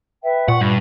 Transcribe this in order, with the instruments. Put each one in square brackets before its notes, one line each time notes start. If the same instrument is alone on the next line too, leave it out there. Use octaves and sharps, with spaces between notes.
[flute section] B4 E5 G5
[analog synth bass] A#2 [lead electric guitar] F#5 [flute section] C#6
[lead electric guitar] G2 [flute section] B5